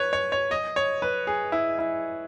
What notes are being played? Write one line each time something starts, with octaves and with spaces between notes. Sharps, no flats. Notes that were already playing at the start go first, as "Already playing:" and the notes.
Already playing: B4 C#5
C#5
C#5
D#5
C#5
B4
G#4
E4
E4